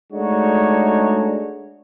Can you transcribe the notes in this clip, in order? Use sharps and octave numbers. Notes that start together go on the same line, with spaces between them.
G#3 A3 D4 D#4 F#4 C#5